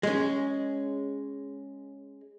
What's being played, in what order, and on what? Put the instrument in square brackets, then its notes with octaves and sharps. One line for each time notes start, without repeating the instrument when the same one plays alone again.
[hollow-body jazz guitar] G#3 C#4